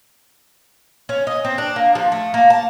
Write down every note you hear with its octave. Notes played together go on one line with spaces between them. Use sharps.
C#4
D#5
C4
D4
A#3
F3
A3
A#3
A5